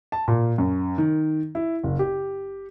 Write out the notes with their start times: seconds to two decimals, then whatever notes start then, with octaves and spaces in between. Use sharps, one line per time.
0.12 A5
0.28 A#2
0.58 F#2
0.98 D#3
1.55 E4
1.83 F#1
1.99 G4